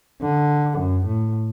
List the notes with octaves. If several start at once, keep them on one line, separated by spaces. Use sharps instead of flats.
D3
F#2
A2